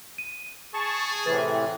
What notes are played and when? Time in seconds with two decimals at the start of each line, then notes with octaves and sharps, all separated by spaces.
0.18 D#7
0.74 G#4 A5 C#6
1.26 A2 C3 E3 B4 A6